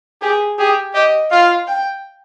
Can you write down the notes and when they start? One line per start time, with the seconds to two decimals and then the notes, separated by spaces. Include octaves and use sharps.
0.21 G4 G#4
0.58 G4 G#4
0.94 G4 D#5
1.30 F4 F5
1.67 G5